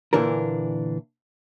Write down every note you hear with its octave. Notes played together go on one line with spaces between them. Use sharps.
A#2 D3 E3 D4 A#4